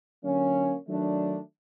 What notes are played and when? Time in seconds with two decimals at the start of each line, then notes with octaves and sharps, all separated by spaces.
0.23 D3 F#3 A#3 C#4
0.88 D#3 F#3 A3 D4